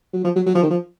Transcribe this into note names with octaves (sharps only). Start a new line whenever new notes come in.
F#3
F3
F#3
F#3
F3
D#3
F3